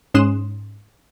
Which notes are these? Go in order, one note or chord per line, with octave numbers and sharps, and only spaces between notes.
G#2 C#4 C6 D#6 F#6 E7